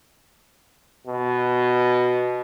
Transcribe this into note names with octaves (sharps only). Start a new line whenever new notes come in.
B2